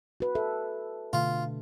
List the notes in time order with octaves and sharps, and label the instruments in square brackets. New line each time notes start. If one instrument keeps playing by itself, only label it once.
[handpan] F#4 B4
A4 E5
[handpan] B2 D3 A3 [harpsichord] F4